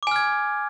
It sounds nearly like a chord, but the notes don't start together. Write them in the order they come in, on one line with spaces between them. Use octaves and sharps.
D6 G#5 F6 G#6